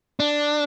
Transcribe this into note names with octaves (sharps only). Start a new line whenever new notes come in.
D4